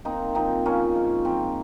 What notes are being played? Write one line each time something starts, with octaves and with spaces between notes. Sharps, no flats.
A#3 C4 D#4
F3 C4 D#4
F3 A#3 C#4
G#2
F3 C4